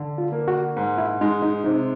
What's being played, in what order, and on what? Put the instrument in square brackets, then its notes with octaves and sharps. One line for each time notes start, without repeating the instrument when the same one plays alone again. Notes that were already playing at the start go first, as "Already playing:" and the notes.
Already playing: [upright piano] D3
[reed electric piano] F4
[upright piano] A#3
[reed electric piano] F#4
[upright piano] G#2
[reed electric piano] E4
[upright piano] G#3 [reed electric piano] D#4
[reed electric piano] D#4
[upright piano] C3 [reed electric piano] D#4